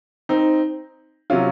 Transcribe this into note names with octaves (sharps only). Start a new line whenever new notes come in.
C4 D#4
C3 F#3 C#4 F4